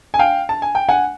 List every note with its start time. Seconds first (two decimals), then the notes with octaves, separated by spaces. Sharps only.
0.14 G#5
0.19 F5 G5
0.49 A5
0.62 G#5
0.75 G5
0.89 F#5 G#5